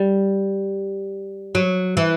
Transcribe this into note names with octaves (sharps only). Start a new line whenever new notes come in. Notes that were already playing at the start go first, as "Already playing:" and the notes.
Already playing: G3
F#3
E3